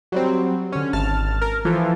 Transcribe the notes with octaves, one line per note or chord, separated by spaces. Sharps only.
F#3 G3 C4
D3 C#4
G#1 A5 F6 A6
A#4
E3 F3 F4 A4